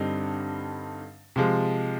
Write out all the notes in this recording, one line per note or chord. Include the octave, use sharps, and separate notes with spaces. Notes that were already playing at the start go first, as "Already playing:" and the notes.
Already playing: G2 D3 G3 C4 D#4
C3 F3 G#3